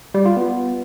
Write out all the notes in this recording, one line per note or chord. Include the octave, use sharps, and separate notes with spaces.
G3
F4
B3